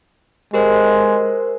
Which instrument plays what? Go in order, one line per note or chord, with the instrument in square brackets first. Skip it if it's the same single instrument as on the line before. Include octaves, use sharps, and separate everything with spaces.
[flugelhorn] G#3 [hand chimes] G4 A#4 C5